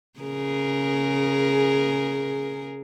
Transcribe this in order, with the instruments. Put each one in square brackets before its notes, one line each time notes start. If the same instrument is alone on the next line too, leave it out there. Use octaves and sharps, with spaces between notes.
[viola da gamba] C#3 G#4 A#4